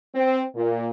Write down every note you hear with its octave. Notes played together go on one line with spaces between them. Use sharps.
C4
A#2